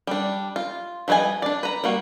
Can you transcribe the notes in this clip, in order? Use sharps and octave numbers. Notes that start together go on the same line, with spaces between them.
G3 D4
F4
F3 G3 B4 D#5 G#5
D4 D5
B4 A#5
G3 A#3 F#4